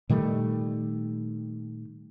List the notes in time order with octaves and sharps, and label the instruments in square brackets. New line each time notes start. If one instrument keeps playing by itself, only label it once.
[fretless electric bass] A#2 D#3 G3 A3